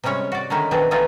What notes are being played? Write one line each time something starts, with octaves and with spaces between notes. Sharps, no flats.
C3 G3 G#3 C#4 C#5
F#4 D5
D3 D#3 G#3 C#4 D#4 E4
B2 D#3 E3 C4 D4 G#4
B2 E3 A3 D#4 F4 G#4